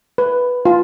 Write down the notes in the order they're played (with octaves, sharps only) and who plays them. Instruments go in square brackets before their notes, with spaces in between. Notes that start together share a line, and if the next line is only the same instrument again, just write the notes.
[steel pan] B4
F4